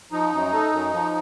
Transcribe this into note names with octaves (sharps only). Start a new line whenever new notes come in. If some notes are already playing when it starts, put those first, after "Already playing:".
F3 D#4
F#2
A3
F#2
F3